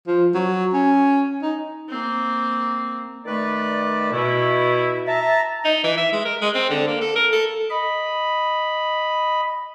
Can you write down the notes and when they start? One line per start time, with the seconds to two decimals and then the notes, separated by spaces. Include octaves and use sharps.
0.07 F3
0.34 F#3
0.73 C#4
1.42 D#4
1.89 A#3 C4
3.25 D#3 A3 B4 D5
4.11 B2 E4
5.06 E5 A5 A#5
5.65 D#4
5.84 E3
5.98 E5
6.13 G#3
6.25 A#4
6.41 G#3
6.55 C4
6.70 D3
6.88 A#3
7.01 A4
7.16 A#4
7.33 A4
7.70 D#5 B5